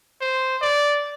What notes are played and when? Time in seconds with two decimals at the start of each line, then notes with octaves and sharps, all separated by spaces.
0.21 C5
0.62 D5